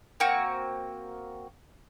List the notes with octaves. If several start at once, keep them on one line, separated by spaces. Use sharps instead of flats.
A#3 C4 F#4 C#6